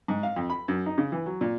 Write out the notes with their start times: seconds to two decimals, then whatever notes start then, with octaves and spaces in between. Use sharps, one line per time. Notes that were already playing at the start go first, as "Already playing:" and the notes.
0.08 G#2
0.23 F5
0.36 F2
0.50 B5
0.68 F#2
0.86 D#4
0.98 C#3
1.12 E3
1.26 F#3
1.41 A#2